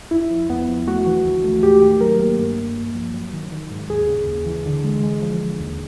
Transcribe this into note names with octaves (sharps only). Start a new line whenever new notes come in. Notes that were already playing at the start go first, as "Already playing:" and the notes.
E2 E4
F3
E2 B3
F3
A3 F#4
E3
D2
A3
G#2 G4
D#3 G4
F#3 A#4
A#3
G2
G2
G2
F3
F#3
D#3
D#3
G#2
D#2 G#4
C#3
D#2
E3
D3
G#3
G#3
F3
D3
D#2